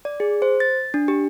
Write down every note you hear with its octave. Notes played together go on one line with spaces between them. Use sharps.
D5
G#4
C5
A6
D4
G4